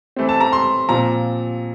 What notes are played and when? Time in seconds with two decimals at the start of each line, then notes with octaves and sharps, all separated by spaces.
0.16 E3 A3 C4
0.29 A5
0.40 A#5
0.52 C6
0.89 A#2 F3 C4 A#5